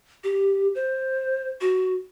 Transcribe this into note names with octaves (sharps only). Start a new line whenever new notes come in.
G4
C5
F#4